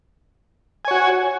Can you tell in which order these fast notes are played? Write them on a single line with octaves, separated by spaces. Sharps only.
G#5 C#5 F#4